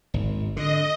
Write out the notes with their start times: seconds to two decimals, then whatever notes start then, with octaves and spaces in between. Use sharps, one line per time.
0.14 G#1
0.57 D3 D#5